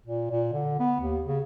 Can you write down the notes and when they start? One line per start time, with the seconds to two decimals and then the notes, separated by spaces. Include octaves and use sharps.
0.06 A#2
0.31 A#2
0.53 D3
0.80 B3
1.00 D#2
1.26 C#3